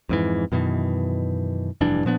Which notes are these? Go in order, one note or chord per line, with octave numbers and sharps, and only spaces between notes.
F2 G#2 E3
F#2 B2 D#3 E3
F1 G2 E3 D4
A#2 F3 B3 D4